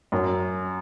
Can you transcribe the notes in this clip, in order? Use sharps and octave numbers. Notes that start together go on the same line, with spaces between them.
F#2